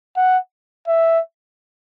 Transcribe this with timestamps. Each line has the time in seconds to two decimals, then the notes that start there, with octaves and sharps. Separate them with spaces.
0.17 F#5
0.88 E5